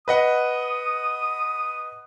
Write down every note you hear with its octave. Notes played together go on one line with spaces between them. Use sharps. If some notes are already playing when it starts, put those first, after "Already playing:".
B4 D#5 F#5 D#6